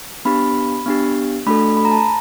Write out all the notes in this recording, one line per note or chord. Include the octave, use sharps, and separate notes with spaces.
B3 D4 G4 B5
B3 D4 G4
A3 D4 F#4 A4 B5
B5
A#5
A5
A#5